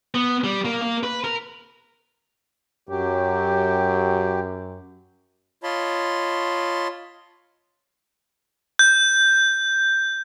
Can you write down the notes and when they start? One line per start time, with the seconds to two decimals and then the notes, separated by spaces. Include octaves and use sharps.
0.15 B3
0.44 G3
0.65 A#3
0.82 A#3
1.03 B4
1.24 A#4
2.89 F#2 F#3 G4
5.63 F4 C#5 D#5 A5 B5 C6
8.79 G6